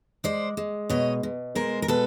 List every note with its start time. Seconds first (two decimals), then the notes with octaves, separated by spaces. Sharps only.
0.24 G#3 C5 D5
0.57 G#3
0.89 B2 C#5 D#5
1.23 B2
1.55 G#3 A#4 C5
1.82 A#4
1.88 B2 A4 B4